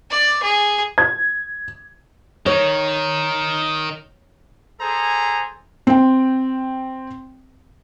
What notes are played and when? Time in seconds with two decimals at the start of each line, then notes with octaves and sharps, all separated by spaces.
0.10 D5
0.42 G#4
0.98 G#6
2.46 D#3 D#4 C#5
4.81 G#4 A4 C5 G#5 A#5
5.87 C4 G5